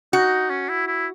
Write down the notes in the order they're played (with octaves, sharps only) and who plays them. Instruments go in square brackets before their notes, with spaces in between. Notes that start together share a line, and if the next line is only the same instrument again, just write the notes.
[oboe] D#4 [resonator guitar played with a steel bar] F#4
[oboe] C#4
E4
E4